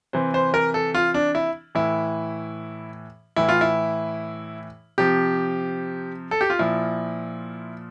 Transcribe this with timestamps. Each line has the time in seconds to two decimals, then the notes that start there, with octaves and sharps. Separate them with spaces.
0.13 C3 E3 C5
0.34 C5
0.54 A#4
0.74 A4
0.95 F4
1.14 D4
1.35 E4
1.75 A2 E3 E4
3.36 A2 E3 E4
3.49 F4
3.61 E4
4.98 C3 F3 G4
6.31 A4
6.41 G4
6.50 F4
6.59 A#2 F3 E4